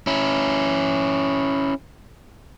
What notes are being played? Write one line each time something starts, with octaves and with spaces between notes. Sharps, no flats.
C#4 E4